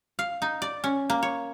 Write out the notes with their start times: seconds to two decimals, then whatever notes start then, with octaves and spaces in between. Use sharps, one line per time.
0.19 F5
0.42 D#4
0.62 D5
0.84 C#4
1.10 A#3
1.23 C#5